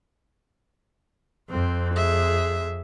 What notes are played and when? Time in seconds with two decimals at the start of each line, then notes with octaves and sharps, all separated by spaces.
1.50 F2 C4
1.95 G#4 E5